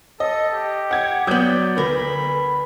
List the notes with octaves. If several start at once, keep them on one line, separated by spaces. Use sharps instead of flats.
A4 D#5
G4
F#5 G#6
F#3 B3 D5 D#6 G6
D2 A#4 B4 B5